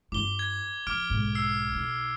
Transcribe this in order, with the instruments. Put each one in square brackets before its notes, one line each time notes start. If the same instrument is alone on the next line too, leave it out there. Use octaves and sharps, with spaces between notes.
[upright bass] G2 F4 [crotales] D6 G7
[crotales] G#6
[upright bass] F3 [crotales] D6 F6 D7
[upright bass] B1 G#2
[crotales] E6 C7
[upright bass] B1 D#4